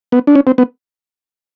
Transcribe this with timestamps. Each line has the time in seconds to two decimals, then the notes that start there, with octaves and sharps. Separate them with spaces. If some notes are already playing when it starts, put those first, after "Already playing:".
0.12 B3
0.27 D4
0.35 C#4
0.47 C4
0.58 B3